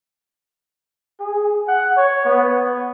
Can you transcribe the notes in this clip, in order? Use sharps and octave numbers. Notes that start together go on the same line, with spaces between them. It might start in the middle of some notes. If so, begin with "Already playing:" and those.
G#4
F#5
C#5
B3